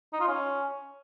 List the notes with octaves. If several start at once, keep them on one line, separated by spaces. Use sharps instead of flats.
D#4
F4
C#4